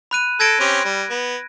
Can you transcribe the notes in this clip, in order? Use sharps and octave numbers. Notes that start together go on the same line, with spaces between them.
B5 F#6 D#7
A4 G#6 A#6 D7
C4 C#4 G4
G3
B3